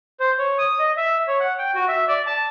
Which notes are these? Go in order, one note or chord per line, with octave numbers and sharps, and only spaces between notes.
C5
C#5
D#6
D#5
E5
C#5
F#5
G5
F#4
E5
D5
A5